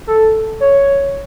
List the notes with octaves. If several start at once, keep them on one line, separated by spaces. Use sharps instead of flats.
A4
C#5